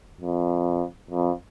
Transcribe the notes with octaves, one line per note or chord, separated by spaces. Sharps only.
F2
F2